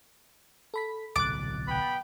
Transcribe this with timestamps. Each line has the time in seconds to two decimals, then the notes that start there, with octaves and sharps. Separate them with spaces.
0.74 A4 B5 B6
1.16 D1 B1 C3 D6 F#6 A6
1.67 B3 G5 B5